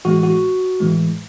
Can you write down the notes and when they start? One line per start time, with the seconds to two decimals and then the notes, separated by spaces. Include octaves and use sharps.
0.05 A2 E3 G#3 F#4
0.23 F#4
0.80 A2 E3 G#3